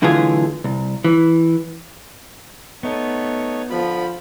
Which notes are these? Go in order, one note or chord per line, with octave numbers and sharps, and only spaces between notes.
B1 D3 E3 A3 F4 G#4
C2
E3
A3 B3 D#4 C#5
D3 F3 B5